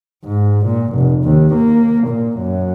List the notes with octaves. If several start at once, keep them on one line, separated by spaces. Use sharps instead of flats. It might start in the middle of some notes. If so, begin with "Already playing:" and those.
G#2
A#2
F1
D#2
A#3
A#2
F#2